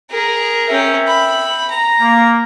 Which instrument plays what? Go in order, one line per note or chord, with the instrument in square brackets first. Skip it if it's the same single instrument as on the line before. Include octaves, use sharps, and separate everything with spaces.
[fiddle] G#4 A#4
[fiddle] C#4 A#4 [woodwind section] E5 G5
[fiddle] B5
A#5
[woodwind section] A#3